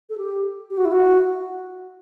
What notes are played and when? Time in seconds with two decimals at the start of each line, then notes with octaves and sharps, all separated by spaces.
0.10 A4
0.18 G4
0.70 G4
0.77 F#4
0.85 E4
0.92 F#4